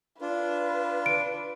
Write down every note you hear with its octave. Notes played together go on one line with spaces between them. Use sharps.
D4 F4 B4
D7